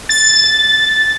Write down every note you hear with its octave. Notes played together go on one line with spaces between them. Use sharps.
A6